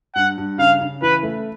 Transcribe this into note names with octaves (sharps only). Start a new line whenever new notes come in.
G2 F#5
G2
C#3 F5
C#3
E3 B4
A3